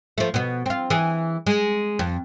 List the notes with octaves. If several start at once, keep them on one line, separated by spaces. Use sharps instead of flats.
F3 A3
B2 B3
C4 F4
E3 G#4
G#3
F2